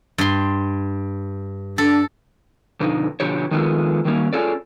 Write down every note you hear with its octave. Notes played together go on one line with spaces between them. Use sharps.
G2 C6
D4 A4
F2 B2 D3 F3 D#4
B2 D3 F3 G4 C#5
D#3 F3 G#3 B3 F4 A4
D#3 F#3 G3 A#3 C#4
C#4 F4 G#4 A4 C#5 D5